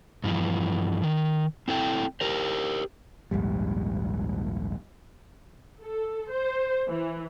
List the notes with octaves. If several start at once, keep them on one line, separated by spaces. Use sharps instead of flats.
G2 E3 F3
D#3
C4 E4 A4 G5
G4 A#4 C5
A#1 D#2 G#2 G3
A4
C5
E3